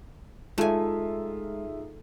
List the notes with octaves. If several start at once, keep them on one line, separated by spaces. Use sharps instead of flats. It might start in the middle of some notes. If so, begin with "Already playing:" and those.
G#3 A3 D#4 F4 G#4 E5 G#5